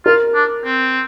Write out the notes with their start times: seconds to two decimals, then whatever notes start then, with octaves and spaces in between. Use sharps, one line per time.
0.05 F4 A#4
0.34 D4
0.65 C4